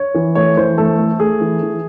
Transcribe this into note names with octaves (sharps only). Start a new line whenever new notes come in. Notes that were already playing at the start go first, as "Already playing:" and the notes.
Already playing: C#5
E3
A3 C#5
E3 C5
A3 A4
A3
A3 G#4
E3
E3